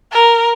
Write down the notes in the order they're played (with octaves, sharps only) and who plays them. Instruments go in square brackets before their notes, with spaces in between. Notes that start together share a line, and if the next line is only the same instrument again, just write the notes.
[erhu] A#4